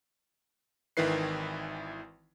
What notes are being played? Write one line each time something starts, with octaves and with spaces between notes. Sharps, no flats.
G#1 D#3 E3 E4 B4 C7